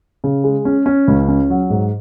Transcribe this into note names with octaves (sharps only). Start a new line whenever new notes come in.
C#3
G#3
C#4
C#4
C#2
C#4
F#3
G#2